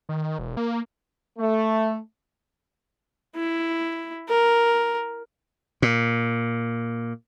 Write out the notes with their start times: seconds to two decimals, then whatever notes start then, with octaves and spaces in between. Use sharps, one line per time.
0.09 D#3
0.39 E1
0.57 A#3
1.39 A3
3.36 E4
4.29 A#4
5.82 A#2